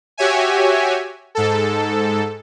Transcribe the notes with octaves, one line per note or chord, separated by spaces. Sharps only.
F#4 G4 C#5 E5 G#5
G#2 A4